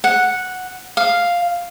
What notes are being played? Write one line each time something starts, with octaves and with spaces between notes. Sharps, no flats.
F#5
F5